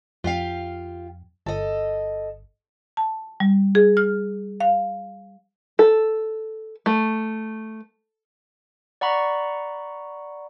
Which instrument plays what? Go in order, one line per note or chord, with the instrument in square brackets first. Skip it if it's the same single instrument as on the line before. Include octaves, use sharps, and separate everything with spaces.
[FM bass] F2 [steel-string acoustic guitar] F4 G4 F5
[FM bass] G1 [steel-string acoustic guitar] A4 D#5
[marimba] A5
G3
G#4
F6
F5
[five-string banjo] A4
A3
[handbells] D5 F#5 A#5 B5 C#6